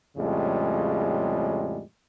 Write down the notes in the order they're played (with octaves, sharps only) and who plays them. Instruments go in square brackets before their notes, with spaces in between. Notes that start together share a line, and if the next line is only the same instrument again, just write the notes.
[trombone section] F2 A2 C#3 G3 G#3